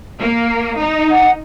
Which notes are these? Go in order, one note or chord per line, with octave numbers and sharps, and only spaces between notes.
A#3
D#4
F#5